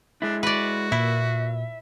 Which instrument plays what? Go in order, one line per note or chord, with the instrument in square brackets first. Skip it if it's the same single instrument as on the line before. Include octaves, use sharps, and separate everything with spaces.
[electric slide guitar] G#3 E4 [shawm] D4
[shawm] F#4 [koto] B4 D5
[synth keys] A#2 [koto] E4 [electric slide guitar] E5